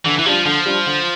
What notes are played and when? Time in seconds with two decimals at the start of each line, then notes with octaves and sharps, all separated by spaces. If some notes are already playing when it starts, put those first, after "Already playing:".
0.05 D3 E3
0.19 E3
0.26 F3 G3 D4 F4
0.45 D3 F3
0.66 G3 D4 F4
0.86 D3